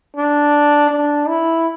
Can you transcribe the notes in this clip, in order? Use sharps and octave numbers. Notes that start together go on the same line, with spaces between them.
D4
D4
E4